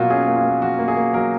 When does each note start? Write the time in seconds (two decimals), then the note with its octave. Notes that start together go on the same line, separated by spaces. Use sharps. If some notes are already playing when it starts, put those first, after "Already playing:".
Already playing: B2 F#3 A#3 F4 F#4
0.10 C#4 G#4
0.28 A#3
0.36 F4
0.45 A#3
0.62 F#3 F#4
0.79 A#3
0.88 G#4
0.96 A#3
1.14 F#3 A#4